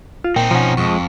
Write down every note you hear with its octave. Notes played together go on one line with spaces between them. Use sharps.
F4
A#2 C4 D#4 G5
B2 F3 C#4 F#5 A#5
F2 F3 G#3 C#6